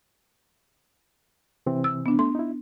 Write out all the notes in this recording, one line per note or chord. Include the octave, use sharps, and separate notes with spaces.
C3 E3 C4
E6
B3 D4
A3 C6
D#4 E4